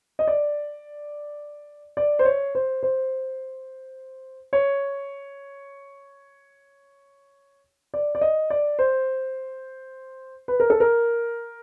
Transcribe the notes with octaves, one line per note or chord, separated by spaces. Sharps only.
D#5
D5
D5
C5
C#5
C5
C5
C#5
D5
D5
D#5
D5
C5
B4
A#4
A4
A#4